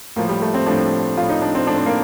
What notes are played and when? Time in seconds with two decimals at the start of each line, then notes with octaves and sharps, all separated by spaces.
0.16 A2 F3 A#3
0.29 G3
0.42 A3
0.54 C4
0.66 A2 F3 D4
1.17 A2 F3 F4
1.29 D#4
1.42 D4
1.55 C4
1.67 A2 F3 D4
1.76 C4
1.86 A#3